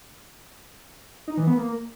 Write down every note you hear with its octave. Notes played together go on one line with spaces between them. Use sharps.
D#4
E3
B3
A#3